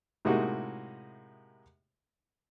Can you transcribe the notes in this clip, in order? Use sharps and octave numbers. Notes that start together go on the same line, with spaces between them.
A2 C3 G#3 A#3 D#4 F#4